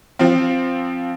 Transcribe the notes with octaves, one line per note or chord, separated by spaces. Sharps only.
F3 C4